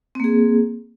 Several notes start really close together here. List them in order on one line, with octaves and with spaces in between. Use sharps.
C4 A#3 G#4